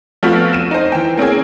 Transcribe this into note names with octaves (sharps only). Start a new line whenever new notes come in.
F3 A3 B3 C4 F4 F#4
D#7 E7
D#4 C5
E3 G5
A#3 C4 C#4 G#4